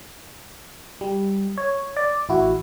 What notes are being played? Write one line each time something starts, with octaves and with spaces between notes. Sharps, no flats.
G3
C#5
D5
A1 E4 F#4